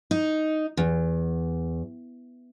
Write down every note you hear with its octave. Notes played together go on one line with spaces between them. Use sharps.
D#4
E2